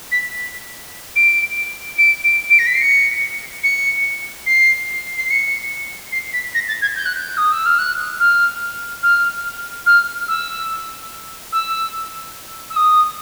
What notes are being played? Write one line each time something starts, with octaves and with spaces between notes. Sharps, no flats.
B6
D7
D7
D7
D7
A#6
B6
C7
C#7
C#7
C7
C7
C#7
C7
B6
A#6
A6
G#6
G6
F#6
G6
D#6
E6
F6
F#6
F6
F6
F6
E6
E6
E6
D#6